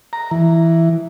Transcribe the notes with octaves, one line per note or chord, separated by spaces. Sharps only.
A#5
E3